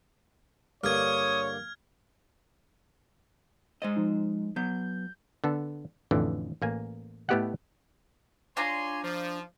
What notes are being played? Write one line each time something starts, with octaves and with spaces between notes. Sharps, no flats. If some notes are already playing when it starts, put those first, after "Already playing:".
G2 D3 A#3 C#5 D#6 F6 G#6
G#3 C5 D#5
F3 D#4
F#3 B3 G6
D3 B3 A4
A1 F2 D3 E3
A1 A#3 G#5
A2 A3 B3 G4 D#5 F#5
D4 F4 C#5 G#5 A#5 C6
F3